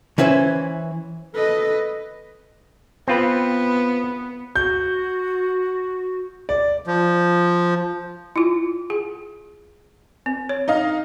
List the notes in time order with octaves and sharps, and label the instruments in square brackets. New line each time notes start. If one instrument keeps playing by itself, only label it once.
[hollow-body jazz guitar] E3 C#4 E4 B4 C5
[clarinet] A4 [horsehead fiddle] B4 D#5
[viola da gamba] B3 [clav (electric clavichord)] C4 F4 B4
[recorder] F#4 [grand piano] G6
[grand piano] D5
[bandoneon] F3
[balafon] E4 F4
G#4
C4
C#5
[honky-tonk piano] D#4 D#5 F5